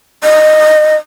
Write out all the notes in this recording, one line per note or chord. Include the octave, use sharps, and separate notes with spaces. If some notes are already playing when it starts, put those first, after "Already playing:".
D#5